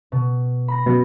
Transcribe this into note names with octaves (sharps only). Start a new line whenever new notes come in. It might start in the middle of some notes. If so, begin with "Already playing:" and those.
B2
B5 A#6
F#2 B2